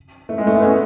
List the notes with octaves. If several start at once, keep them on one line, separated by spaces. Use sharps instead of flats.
A3
G#3
A3
B3
C#4